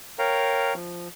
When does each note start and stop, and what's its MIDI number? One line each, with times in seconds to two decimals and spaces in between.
0.19 0.74 70
0.19 0.74 73
0.19 0.74 77
0.19 0.74 79
0.19 0.74 82
0.74 1.08 53